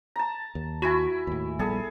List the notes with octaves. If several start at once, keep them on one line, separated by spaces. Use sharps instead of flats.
A5 A#5
D#2
E4 F#4 G#5 B5
D#2 A2
A#1 G3 B3 G#4 A4